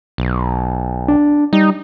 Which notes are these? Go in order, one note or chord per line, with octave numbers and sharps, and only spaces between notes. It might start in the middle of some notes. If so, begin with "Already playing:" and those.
B1
D4
G3 D#4